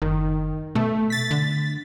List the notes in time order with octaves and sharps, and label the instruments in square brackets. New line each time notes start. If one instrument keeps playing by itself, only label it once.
[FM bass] F#1 [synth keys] D#3
[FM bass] B2 [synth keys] A3
[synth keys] A6 B6
[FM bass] D3